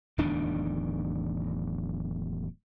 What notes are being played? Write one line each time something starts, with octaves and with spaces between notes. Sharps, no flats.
D1 E2 D#3 D4